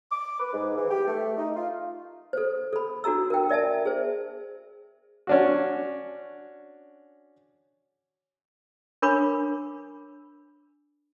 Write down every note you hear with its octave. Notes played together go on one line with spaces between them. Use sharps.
D6
B4
G#2
E3
G4
A3
D#4
F4
A4 C5
A4 B5
D4 F#4 A4 A#5 E6
A#4 G5
A#4 D5 E5 G#5 A5
G#4 C5
C#4 D4 F#4
D4 A#4 C#5 B5 D6